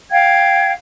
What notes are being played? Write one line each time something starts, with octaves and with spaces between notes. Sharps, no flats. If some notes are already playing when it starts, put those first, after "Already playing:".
F5 G5 G#6